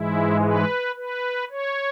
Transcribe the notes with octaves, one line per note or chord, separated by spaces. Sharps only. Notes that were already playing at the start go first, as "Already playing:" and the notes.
Already playing: G#2 E3 G#3 E4
B4
B4
C#5